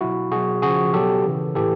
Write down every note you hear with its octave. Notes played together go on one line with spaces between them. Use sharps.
B2 F#3 E4 F#4
B2 F#3 F#4 G#4
C#3 F3 F#4 G#4
B2 F#3 G4 A4
C#3 E3
A2 E3 G4 A4